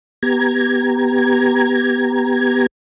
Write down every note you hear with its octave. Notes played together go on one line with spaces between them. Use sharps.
B3 G4 A#5 G#6